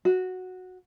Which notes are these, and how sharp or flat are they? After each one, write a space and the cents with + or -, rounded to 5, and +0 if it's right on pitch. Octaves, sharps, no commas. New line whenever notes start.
F#4 -5